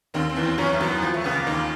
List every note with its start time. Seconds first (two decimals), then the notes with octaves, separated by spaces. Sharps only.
0.14 D#2 D#3 C4
0.29 C4
0.36 E2 E3
0.43 C4
0.58 F#2 F#3 C#4
0.73 A3
0.80 F#2 F#3
0.88 B3
1.02 F2 F3
1.14 A3
1.24 C#2 C#3 B3
1.36 A#3
1.47 D#2 D#3